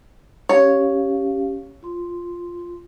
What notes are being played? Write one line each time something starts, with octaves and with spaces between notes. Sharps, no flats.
C#4 G4 C#5 F5
F4 C6